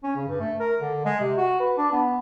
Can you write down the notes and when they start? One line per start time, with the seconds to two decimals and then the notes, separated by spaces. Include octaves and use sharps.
0.03 C#4
0.16 C#3
0.28 G2
0.40 A3
0.60 A#4
0.81 D3
1.05 G#3
1.20 C3
1.37 F#4
1.59 B4
1.77 D4
1.92 B3